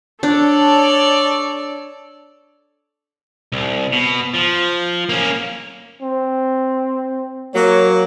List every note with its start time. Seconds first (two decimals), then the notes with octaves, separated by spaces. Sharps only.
0.23 D4 A4 C#5 D5
3.52 C2
3.93 B2
4.35 F3
5.09 A#3 C#4
6.02 C4
7.54 F#3 A#3 C#5